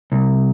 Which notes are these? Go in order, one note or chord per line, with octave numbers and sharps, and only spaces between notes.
C2